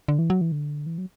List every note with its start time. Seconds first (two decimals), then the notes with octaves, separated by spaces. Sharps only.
0.08 D3
0.19 E3
0.30 F#3
0.41 E3
0.52 D3
0.86 E3
0.98 F#3